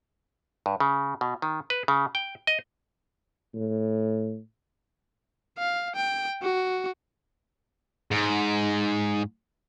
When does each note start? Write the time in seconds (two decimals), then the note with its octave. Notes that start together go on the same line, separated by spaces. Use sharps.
0.66 G2
0.80 C#3
1.21 B2
1.42 D#3
1.70 B4
1.88 C#3
2.15 G5
2.47 D#5
3.54 A2
5.58 F5
5.96 G5
6.42 F#4
8.11 G#2